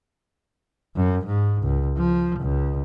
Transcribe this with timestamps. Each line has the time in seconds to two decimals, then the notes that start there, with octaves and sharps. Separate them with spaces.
0.96 F#2
1.26 G#2
1.63 C#2
1.97 F3
2.40 C#2